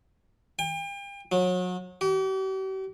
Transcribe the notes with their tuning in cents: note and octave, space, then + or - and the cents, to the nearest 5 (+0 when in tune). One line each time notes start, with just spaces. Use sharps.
G5 +40
F#3 -30
G4 -45